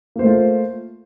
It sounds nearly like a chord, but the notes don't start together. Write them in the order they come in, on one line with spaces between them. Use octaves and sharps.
A#3 C5 A3 F4